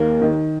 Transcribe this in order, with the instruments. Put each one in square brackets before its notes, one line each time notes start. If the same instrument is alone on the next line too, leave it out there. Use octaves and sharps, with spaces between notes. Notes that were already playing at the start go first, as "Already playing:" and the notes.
Already playing: [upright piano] D#2 [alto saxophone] A#3
[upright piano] D#3